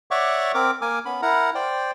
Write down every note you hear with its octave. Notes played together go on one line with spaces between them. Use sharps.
C#5 D5 E5 F#5 C#6 D6
C4 A#4 D6
A#3 A#4 G#5 D6
B3 C#4 B5
E4 A#4 F#5 A#5
C5 D5 G5